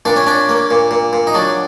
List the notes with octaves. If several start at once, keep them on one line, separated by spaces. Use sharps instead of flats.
A#2 D4
C#4
C#4 D4
A#3
A#2
A#2
A#2
D#4
F#3 D4